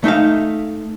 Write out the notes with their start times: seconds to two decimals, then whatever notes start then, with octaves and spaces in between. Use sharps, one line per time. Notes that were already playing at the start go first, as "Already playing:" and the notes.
0.04 A3 D#4 E5 F5